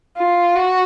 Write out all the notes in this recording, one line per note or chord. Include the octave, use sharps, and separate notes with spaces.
F4
F#4